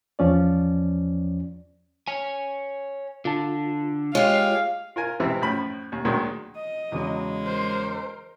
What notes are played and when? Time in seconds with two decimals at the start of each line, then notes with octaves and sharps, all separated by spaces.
0.19 E2 F3 C#4 D5
2.08 C#5 G#5
3.25 D3 F4 A5
4.15 G#3 F4 G4 C#5 F5
4.96 F4 A#4 G#5
5.20 G#2 C3 E3 C4 E4
5.42 F#2 A2 F3 B5
5.92 D#2
6.05 D2 A#2 D#3 F#3 G#3
6.56 D#5
6.92 E2 C#3 F#3 G#3
7.44 A#4 C5